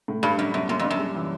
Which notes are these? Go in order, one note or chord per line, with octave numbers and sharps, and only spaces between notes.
A2
G2 G3
F#2 D4
F#2 B2
F#2 A#3
F2
D4
F#2
G3
E3